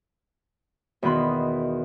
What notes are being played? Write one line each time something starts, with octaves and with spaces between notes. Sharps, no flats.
E2 B2 D#3 B3 B5 C6